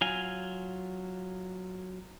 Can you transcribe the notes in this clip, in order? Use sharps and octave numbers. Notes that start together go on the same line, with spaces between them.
F#3 F4 G#5